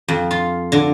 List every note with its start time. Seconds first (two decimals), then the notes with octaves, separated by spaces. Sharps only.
0.08 F2
0.31 F4
0.72 D3